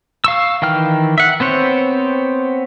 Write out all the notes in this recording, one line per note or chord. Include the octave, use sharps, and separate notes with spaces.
F5 C#6 E6
D#3 E3 G5 F6
E5 F#5
B3 C4 C5 C#5